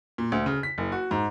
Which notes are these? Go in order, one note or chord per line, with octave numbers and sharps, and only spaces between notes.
A#2
D2
C#3
B6
F#1
F#4
G#2